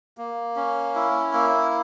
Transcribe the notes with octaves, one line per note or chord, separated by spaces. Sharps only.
A#3
C#4
E4
A#3